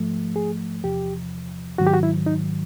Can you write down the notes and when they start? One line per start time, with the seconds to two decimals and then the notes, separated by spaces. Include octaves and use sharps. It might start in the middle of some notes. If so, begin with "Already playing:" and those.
Already playing: G#2 F3 A3
0.36 G#4
0.83 E2 C3 F3 G4
1.78 G#2 D#3 F#3 F#4
1.87 G4
1.94 F#4
2.03 E4
2.26 D#4